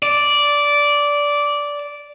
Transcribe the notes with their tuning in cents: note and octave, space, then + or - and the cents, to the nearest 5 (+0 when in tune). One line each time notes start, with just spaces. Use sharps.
D5 -10